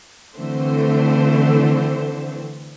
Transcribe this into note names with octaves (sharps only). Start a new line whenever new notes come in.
D3 E3 A3 C4 C5